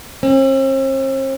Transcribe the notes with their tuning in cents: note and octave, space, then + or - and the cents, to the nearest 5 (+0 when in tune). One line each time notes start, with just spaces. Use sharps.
C4 +45